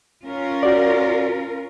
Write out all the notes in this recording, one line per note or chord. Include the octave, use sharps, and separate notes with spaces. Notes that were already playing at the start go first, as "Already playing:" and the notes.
C#4 F4 A#4
F#4 D5